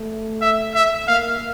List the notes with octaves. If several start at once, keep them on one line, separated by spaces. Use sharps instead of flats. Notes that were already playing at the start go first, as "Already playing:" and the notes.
Already playing: A3
E5
E5
A#3 F5